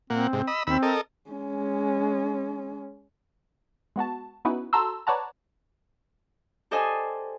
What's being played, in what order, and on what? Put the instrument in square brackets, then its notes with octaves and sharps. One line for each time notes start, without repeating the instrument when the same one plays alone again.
[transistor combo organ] A#2 A#3 F#5 [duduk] C4
[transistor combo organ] G#2 C3
D#5 B5 E6
[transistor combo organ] D#2 B5 E6 [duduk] C4
[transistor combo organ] A4 A#4 D#5
[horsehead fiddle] G#3 C#4
[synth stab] G#3 B3 F#4 A5
B3 C#4 D#4 E4 F#4 B4
F#4 A4 A5 A#5 C6 E6
B4 C#5 D5 F#5 A5 A#5
[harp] G4 A4 C5 D5 D#5 G#5